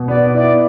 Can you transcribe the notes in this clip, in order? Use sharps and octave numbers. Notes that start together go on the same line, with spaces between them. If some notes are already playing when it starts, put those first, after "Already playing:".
Already playing: B2
B3 D5
E4 D5